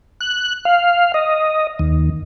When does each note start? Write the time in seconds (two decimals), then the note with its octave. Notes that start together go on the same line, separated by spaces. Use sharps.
0.21 F#6
0.65 F5
1.14 D#5
1.79 D#2